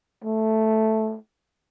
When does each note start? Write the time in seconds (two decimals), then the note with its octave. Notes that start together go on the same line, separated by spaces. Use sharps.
0.24 A3